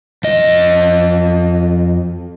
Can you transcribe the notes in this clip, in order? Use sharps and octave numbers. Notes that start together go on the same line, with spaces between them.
F2 D#5